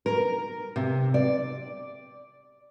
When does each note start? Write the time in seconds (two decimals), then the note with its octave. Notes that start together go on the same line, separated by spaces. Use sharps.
0.06 A#4
0.76 C3
1.14 D5